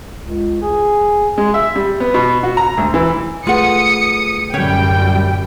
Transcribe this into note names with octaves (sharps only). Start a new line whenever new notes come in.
C#2
G#4
G#3
E5
G3
B3
B2
F#4
A#5
D2
E3
A3 F4 G#4 B4 F#5 D#6 C#7
F#2 A2 D3 G3 C#4 C#5 G5